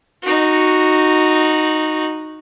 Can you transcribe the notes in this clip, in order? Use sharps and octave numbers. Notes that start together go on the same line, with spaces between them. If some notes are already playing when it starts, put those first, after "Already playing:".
D#4 F#4